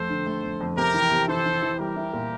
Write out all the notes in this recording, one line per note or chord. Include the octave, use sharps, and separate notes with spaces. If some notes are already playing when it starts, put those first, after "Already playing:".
Already playing: F2 A3 A4 C5
D3
A3
F2
F2
C3 G4 A#4
E3
C3
E3 A4 C5
E3
E3
G3 G4 A#4
E4
A#2